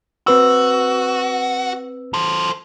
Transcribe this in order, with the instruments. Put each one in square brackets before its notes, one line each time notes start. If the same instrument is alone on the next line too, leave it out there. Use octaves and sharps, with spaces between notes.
[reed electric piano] C4 B4 E6 [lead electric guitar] F#4
[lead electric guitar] A4 C5